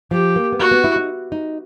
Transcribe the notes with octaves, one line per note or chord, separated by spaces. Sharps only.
F3 G4
A#3
B3
A#3 F#4
B3
E4
D#4
D#4